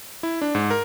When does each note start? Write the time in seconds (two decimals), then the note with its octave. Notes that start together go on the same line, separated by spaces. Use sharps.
0.23 E4
0.42 D4
0.55 G#2
0.71 A#4